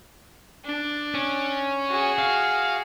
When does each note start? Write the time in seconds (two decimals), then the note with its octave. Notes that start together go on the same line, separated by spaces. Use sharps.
0.65 D4
1.15 C#4
1.90 F#4 G#4
2.18 F5